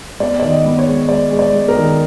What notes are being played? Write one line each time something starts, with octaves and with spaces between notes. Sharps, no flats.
B3 D5
D#3 D5
D#5
B3
C#5
G#3
G#3 D5
G#3
D5
B3
A#4
D#3